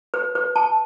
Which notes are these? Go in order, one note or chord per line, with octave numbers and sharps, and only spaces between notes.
B4
B4
A5